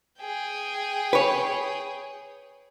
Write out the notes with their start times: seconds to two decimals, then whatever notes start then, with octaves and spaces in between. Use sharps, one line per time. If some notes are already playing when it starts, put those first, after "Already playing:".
0.20 G#4 G5
1.13 B4 C#5